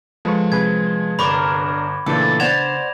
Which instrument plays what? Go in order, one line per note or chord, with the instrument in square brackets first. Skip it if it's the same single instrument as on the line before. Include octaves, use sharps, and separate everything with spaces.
[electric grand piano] F3 G#3 [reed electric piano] A4 B4 C#6
[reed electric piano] C3 G#4 B4 [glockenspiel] G#6
[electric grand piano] G1 [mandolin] D4 A#4 [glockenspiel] B5 C#6 D6
[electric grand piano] A#2 E3 A3 [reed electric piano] C#3 D4 [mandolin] A4
[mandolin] B3 C5 A5 [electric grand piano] D5 E7 [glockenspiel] G#6 A#6 F7